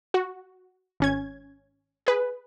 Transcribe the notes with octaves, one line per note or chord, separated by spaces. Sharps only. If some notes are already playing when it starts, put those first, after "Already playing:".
F#4
G#1 C#4 G#6
G#4 B4